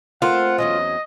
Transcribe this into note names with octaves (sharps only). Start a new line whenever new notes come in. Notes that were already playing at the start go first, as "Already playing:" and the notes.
A3 A#3 C4 F4 F#5
E2 F#3 C#4 D#5